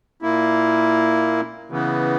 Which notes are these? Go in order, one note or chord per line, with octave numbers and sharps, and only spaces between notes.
A#2 A#3 E4
C#3 E3 B3